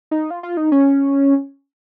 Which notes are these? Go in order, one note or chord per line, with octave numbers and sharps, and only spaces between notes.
D#4
F4
F4
D#4
C#4